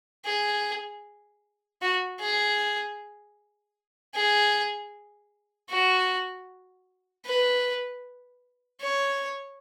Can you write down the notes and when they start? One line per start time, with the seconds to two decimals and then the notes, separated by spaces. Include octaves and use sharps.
0.25 G#4
1.82 F#4
2.19 G#4
4.15 G#4
5.69 F#4
7.26 B4
8.81 C#5